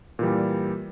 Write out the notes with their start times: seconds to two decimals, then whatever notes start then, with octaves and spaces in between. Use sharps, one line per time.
0.19 A#2 E3 G3